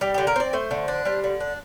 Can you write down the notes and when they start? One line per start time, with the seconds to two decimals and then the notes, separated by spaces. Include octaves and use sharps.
0.01 G3 G4
0.14 D3 G4
0.27 A#4
0.36 C4 D5
0.53 A3 C5
0.71 D3
0.88 D4
1.05 G3 C5
1.24 D3
1.40 D4